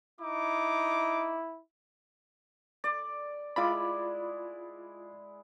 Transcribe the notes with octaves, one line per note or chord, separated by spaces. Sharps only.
D#4 E4 D6
D5
G#3 E4 F4 D5 B5